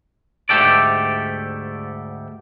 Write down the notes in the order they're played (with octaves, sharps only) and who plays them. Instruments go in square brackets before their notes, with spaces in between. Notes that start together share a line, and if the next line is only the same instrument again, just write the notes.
[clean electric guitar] D2 G#2 A3 G4 A4 D5